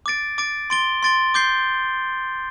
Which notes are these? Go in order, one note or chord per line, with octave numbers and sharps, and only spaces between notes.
D6 A6 D7
D6 A6 D7
C6 A6 D7 G7
C6 A6 D7 G7
D6 G6 C7 G7